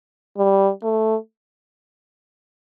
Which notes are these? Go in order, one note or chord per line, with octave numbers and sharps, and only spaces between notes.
G3
A3